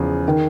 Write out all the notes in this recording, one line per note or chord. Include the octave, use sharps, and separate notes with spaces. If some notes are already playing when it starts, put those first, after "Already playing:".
Already playing: E2 C#3 F3 G#4
D#3